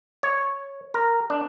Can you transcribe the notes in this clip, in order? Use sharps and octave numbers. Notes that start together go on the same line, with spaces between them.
C#5
A#4
D4